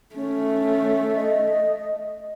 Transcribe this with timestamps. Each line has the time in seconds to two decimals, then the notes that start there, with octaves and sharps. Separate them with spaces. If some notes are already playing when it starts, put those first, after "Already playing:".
0.15 A3 C#4
1.16 D#5